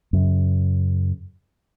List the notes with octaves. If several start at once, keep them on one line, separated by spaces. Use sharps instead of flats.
F#2 C#3